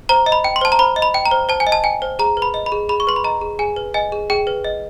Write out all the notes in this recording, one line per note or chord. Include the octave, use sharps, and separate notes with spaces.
C5 A#5
D#5
B5
G5
C6
C5 A5
A#5
C5 B5
D#5
B5
G5
A#5
C5
C5 A5
G#5
D#5
A5
G5 G#5
C5
G#4 A#5
B4
B5
D#5
B5
G#4
G#4 B5
C#6
B4 C6
B5
D#5 A#5
G#4
G#4 G#5
B4
D#5 G#5
G#4
G#4 G5
B4
D#5